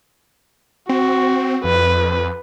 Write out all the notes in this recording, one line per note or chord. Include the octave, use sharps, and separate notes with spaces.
C4 F#4
F2 B4